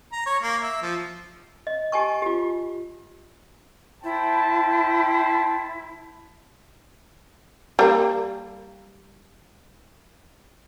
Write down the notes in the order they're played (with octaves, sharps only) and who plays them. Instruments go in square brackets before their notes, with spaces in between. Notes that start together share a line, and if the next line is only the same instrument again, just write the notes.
[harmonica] A#5
C#5
A#3
E5
F3
[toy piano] D#5
G4 D#5 G#5 A5 C#6
F4 G4
[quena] E4 [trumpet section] C5 G5 A5
[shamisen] G3 A#3